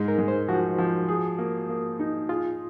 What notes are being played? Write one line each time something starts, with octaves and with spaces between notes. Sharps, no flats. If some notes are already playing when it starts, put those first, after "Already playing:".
Already playing: G#2 G#3 D#4
A#4
G#3
C5
F3 F#4
F3
G#4
A#3
A#3
D#4
F4 G#4